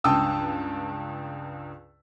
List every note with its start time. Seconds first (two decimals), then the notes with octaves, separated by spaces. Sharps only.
0.04 C#2 G2 G5 A5 D#6 E6